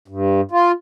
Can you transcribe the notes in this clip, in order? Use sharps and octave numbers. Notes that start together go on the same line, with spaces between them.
G2
F4